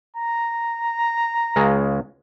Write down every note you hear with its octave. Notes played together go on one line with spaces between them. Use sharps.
A#5
C#2 C#3 G#3